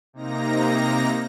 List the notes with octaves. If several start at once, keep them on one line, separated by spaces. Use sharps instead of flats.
C3 A#3 D#4 A#5 A#6